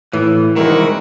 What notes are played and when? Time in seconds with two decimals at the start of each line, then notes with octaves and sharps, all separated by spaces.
0.13 A2 E3
0.56 C2 D#3 G#3 E4 F#4 A#4